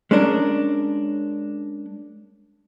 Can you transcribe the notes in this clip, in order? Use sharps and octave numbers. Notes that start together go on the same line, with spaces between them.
G#3 C#4 D4 A#4